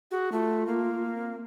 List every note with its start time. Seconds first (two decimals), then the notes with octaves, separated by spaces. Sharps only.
0.11 F#4 G#4
0.32 A3 F4
0.67 A#3
1.13 C4